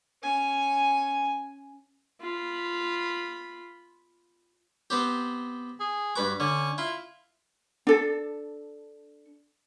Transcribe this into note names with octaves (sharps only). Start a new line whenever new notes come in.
C#4 G#5
F4 B5
B3 C4 G4
G#4
G2 F#4 B4 D6
D3 C#4
E4 F4
D4 A4